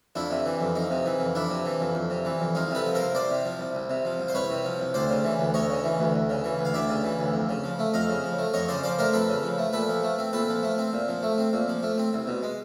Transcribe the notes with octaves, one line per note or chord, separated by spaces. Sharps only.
F2 D4 E4
C3
E3
F2
F2 D#4
C3
E3
F2
F2 D4 E4
C3
E3
F2
F2
C3
E3
F2
C2 D#4 F4
C3 A4 B4
F3
A#4 C5
C2
C2 C5 D5
C3
F3
C2
C2
C3
F3
C2
C5
C2 B4 C#5
C3
F3
C2
D2 C5 D5
C#3
E3
D2
D2 C#5 D#5
C#3
E3
D2
D2
C#3
E3
D2
F5
D2 D5 E5
C#3
E3
D2
F2
C#3
F3
A3
F2 D#5 F5
C#3
F3
A3
F2 C#5 D#5
C#3 C5 D5
F3 C5 D5
A3 A#4 C5
F2 A4 B4
C#3
F3
A3
A#2 A4 B4
F3
A3
C4
A#2 A4 B4
F3
A3
C4
A#2
F3
A3
C4
A#2
F3
A3
C4
C2
B2
G#3